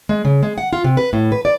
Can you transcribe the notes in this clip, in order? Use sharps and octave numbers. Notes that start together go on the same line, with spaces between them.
G#3
C#3
G#3
F#5
F4
C3
B4
A2
B4
D5